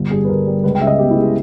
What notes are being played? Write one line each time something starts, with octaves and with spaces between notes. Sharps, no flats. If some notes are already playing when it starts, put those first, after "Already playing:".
Already playing: G1
G2 G#4
B4
G1 A#4
G3
C#2 B4
G5
C#3 E5
D#5
B3 G4
E4
G#3
G#4